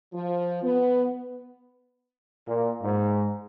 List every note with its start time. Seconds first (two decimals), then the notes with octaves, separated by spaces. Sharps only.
0.13 F3
0.63 B3
2.48 A#2
2.83 G#2